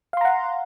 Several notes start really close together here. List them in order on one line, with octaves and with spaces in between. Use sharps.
F5 C6 A#5 F#5